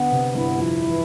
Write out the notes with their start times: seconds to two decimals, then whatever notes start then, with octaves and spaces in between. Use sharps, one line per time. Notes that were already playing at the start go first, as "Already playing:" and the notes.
Already playing: D3 B3
0.12 C3
0.35 G2 E4
0.59 F2
0.83 E3